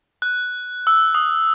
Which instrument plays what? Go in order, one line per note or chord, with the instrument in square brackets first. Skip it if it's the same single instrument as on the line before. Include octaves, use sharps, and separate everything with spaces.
[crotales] F#6
E6
D#6